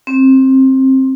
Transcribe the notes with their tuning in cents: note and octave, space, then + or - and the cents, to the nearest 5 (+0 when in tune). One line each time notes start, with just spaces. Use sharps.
C4 +20